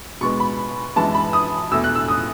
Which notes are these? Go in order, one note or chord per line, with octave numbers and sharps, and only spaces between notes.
B2 G#3 B3 C#6
B5
F#2 E3 G#3 B3 A5
B5
D#6
E2 B2 A3 E6
F#6
E6
D#6